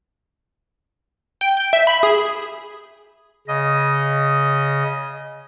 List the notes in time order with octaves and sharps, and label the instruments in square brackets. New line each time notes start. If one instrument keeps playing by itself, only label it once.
[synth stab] G5
G6
E5
B5
G#4
[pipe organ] C#3 D#5